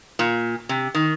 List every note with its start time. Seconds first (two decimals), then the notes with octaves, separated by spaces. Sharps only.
0.19 A#2
0.69 C3
0.95 D#3